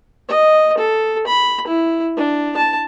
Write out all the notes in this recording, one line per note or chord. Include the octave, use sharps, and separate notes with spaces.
D#5
A4
B5
E4
D4
A5